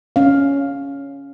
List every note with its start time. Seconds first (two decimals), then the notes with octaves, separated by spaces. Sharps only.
0.16 C#4 F5